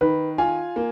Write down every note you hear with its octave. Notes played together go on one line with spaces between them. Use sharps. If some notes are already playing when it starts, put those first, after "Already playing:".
D#3 B4
F4 G#5
A#3